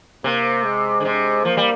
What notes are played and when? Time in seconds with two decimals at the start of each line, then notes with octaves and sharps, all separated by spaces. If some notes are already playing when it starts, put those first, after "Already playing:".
0.24 C3 A#3
0.64 G#3
1.00 D3
1.05 C3
1.45 F3 A#3
1.57 G3